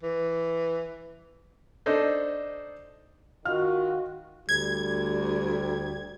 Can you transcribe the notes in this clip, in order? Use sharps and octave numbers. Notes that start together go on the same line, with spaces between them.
E3
D4 D#4 A4 C5 D#5
D#3 F4 F#4 D#5 F6
D2 G3 G#6